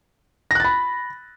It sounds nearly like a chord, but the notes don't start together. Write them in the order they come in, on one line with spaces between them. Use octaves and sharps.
A#6 F#6 A6 B5